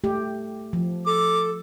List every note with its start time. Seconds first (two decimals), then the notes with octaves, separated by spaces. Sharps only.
0.04 A3 G4
0.73 F3
1.06 A4 D6